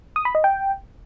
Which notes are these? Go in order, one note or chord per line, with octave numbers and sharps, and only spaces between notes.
D#6
B5
D#5
G5